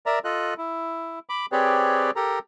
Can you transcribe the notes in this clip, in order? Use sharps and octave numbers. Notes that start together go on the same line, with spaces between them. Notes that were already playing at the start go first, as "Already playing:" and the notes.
A#4 D5 E5 A#5
F4 A4 D#5 F#6
E4
B5 D6
C4 G4 G#4 B4 C#5 D5
G4 A4 A#4 A#5